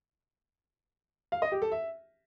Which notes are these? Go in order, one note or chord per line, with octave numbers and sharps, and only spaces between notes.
F5
D#5
G4
A4
E5